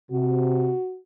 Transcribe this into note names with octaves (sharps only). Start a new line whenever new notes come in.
C3 F#4